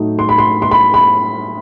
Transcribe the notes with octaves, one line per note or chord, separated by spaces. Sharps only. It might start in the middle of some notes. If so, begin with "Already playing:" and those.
Already playing: A2 F#3 A3 D#4
C6
B5
C6
C6
B5
B5